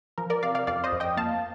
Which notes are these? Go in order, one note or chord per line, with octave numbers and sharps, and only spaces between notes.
F3 A#4
A#4 D5
C3 D5 F5
D5 F5
F2 D5 F5
C5 D#5
F2
D#5 G5
A#3 F5 A5